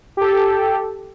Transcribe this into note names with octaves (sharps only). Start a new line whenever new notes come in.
G4 A4